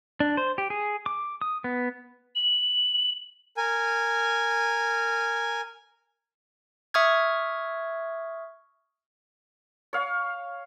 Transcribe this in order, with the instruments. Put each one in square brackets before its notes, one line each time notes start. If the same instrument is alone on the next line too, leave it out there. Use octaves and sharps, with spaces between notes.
[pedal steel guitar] D4
C5
G4
G#4
D6
D#6
B3
[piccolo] F#7
[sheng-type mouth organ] A#4 G#5
[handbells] E5 C#6 D#6 F6 G#6
[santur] C#5 F5